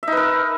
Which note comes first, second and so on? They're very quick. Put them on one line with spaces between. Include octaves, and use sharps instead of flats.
E5 D#4 B4 A#4